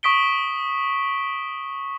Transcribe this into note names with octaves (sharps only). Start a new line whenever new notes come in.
C#6 D#6 B6 D7 G7